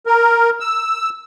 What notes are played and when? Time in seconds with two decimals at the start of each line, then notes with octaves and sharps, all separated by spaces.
0.06 A#4
0.60 E6